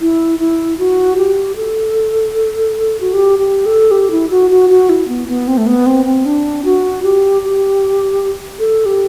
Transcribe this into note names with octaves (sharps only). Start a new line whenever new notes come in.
E4
E4
F#4
G4
A4
F#4
G4
G4
A4
G4
E4
F#4
F#4
F#4
E4
B3
B3
C4
A3
B3
C4
C4
D4
F#4
G4
G4
A4
G4